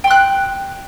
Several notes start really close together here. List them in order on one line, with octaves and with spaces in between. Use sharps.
G5 C6 F#6